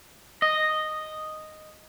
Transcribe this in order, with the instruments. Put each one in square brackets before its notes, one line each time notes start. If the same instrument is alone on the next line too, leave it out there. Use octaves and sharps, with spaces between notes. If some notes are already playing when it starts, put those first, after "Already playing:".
[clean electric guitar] D#5